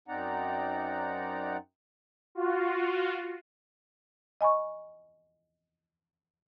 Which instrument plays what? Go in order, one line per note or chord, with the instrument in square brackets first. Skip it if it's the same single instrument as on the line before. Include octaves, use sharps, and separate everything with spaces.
[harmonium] F#2 C4 D#4 D5 F#5 A#5
[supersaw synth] F4 F#4
[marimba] D#5 G#5 B5 C#6